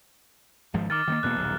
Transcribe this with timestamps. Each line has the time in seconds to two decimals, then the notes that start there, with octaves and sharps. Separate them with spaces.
0.74 G#1 G#2 F3
0.90 D#3 D6 F6 A6
1.08 D#3 A3 A#3
1.23 E1 B2 A#3 F#6
1.36 D#1 B1